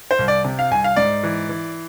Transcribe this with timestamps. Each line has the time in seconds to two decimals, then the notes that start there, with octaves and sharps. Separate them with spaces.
0.11 C5
0.19 C2
0.28 D5
0.45 C3
0.59 F5
0.71 C2 G#5
0.84 F5
0.96 G#2 D5
1.24 E3
1.49 E3